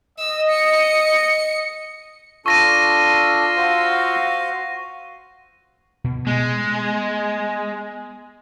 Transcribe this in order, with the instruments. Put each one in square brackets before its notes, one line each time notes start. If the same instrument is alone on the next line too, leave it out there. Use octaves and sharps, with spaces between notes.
[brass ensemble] D#5 [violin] E6
[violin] C#7
[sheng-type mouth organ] D4 A4 [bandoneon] F4 C6 E6 [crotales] C#6 A#6 D#7
[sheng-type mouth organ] F#4 C5 F5
[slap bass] B2
[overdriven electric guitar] G#3 [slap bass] B3